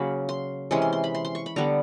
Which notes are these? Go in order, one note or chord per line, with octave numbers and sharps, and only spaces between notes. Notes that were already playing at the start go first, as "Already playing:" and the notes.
Already playing: C#3 F#3 A#3 B5
C6
C3 E3 G#3 C#4 C6
C6
C6
B5
C6
C6
C#6
B5
D3 G3 B3 A#5